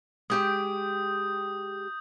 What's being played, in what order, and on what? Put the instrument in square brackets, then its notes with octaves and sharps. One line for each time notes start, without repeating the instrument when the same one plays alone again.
[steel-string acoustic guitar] G#3 G4 G5 [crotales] D#6 G6